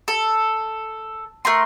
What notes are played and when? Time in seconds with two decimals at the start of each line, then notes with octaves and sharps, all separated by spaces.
0.08 A4
1.45 A3 A#4 C6